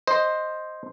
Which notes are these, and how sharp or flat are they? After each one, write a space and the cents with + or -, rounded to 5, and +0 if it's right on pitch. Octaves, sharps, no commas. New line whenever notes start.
C5 +5 D#5 +0